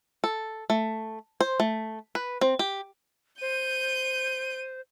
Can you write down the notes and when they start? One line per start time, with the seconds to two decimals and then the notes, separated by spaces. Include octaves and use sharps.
0.24 A4
0.70 A3
1.41 C5
1.60 A3
2.15 B4
2.41 C4
2.59 G4
3.41 C5 G6 D#7